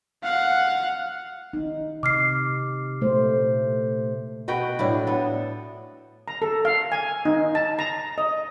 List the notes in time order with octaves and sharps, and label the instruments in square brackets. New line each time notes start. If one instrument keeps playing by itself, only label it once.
[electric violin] F5 F#5
[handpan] D#4
[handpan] C3 [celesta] D6 F6 C7
[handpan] A#2 A3 C5
[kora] B2 F#4 B4 G5
A2 D4 E4
B3 A4
[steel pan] A#5
A4
F5
G#5
D#4
A5
A#5
D#5